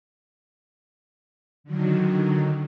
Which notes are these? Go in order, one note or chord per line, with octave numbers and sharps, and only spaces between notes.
D3 D#3 F#3